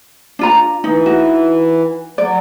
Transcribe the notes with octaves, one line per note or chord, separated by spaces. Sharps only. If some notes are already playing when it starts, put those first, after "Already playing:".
D4 F4 A#5
E3 D#4
D#4 F#4
F#3 D5